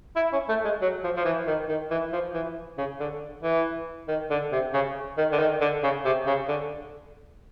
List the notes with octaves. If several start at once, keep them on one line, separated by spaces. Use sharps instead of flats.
E4
C#4
A3
G#3
F#3
F3
F3
E3
D#3
D#3
E3
F3
E3
C#3
D3
E3
D#3
D3
C3
C#3
D#3
D3
D#3
D3
C#3
C3
C#3
D3